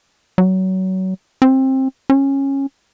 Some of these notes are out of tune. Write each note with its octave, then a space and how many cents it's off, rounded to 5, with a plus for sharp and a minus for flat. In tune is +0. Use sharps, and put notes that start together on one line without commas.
F#3 +25
C4 +20
C#4 -15